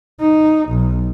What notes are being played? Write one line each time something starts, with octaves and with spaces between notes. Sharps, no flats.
D#4
B1